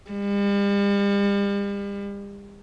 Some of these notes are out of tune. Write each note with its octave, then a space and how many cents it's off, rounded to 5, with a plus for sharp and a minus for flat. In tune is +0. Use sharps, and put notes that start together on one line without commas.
G3 +40